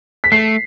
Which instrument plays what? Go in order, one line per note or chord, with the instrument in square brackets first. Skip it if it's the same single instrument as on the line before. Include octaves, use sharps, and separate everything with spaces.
[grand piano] B6
[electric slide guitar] A3 [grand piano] C7